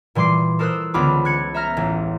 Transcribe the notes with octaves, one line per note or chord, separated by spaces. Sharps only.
A#2 E3 G3 C6 D6 C7
A4 A#4 C5 D#6 E6 F#6
C#2 D3 B3 F4 B5 D6
F#6 G#6 C#7
E5 A#5 F6 A#6
A1